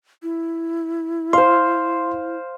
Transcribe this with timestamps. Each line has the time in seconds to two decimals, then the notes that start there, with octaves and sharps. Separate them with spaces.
0.23 E4
1.33 C5 F5 C6